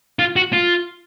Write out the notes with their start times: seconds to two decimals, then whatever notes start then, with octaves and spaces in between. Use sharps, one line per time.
0.19 F4
0.36 F#4
0.53 F4